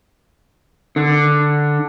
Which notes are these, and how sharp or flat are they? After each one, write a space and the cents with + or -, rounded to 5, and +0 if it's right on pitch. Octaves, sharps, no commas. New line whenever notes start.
D3 +5